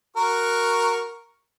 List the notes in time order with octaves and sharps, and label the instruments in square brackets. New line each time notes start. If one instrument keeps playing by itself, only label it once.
[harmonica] F#4 A#4 C#6